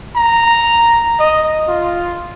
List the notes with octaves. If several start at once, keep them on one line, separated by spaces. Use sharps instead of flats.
A#5
D#5
F4